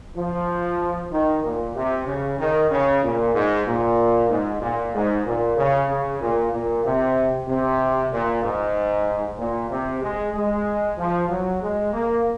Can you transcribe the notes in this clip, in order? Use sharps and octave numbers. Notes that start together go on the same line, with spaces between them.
F3
D#3
A#2
C3
C#3
D#3
C#3
A#2
G#2
A#2
G#2
A#2
G#2
A#2
C#3
C#3
A#2
A#2
C3
C3
A#2
G#2
A#2
C3
G#3
G#3
F3
F#3
G#3
A#3